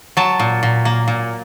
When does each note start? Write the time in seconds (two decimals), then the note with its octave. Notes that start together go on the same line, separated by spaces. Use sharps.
0.17 F#3 A5
0.39 A#2
0.63 A#2
0.85 A#3
1.08 A#2